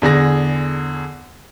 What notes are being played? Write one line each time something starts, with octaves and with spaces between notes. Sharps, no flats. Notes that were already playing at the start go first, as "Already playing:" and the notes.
E2 D3 G#4 A#6